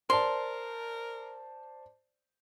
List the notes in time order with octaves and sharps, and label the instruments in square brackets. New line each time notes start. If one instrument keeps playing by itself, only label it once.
[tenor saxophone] A#4 [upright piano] C5 D5 A5 [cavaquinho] C6